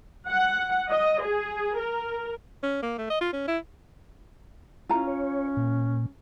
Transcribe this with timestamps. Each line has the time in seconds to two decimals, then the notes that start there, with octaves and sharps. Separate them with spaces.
0.30 F#5
0.91 D#5
1.23 G#4
1.77 A#4
2.63 C#4
2.82 A#3
2.98 A3
3.10 D#5
3.21 F4
3.33 C#4
3.48 E4
4.89 C#4 E4 F4 A#5
5.07 C#5
5.57 A#2